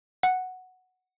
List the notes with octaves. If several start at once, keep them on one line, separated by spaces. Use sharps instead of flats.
F#5